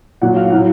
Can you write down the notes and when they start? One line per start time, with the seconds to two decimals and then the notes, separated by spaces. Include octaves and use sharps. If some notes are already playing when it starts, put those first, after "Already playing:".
0.22 A#2 F#3 F#5
0.36 F5
0.50 A2 F#3 F#5